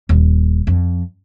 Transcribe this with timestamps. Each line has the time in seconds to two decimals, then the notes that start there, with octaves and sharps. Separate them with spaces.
0.09 D#1
0.67 F2